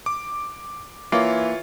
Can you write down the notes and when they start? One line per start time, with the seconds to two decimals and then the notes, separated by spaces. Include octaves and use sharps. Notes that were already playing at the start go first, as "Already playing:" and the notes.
0.06 D6
1.12 E3 A#3 F4 C#5